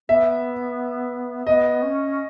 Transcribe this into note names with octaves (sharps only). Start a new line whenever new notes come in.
B3 E5
B3 D#5
C#4